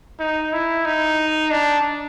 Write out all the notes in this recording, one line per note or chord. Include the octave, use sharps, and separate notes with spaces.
D#4
E4
D#4
D4